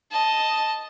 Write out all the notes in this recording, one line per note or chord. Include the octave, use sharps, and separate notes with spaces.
D#5 A5